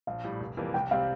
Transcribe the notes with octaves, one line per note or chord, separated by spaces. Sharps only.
A#1 F5
A2 G3
F1
F2 E3 G3 A#3
C2 G5
C3 G3 C4 F5